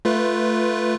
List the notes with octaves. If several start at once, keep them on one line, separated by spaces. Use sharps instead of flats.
A3 F4 B4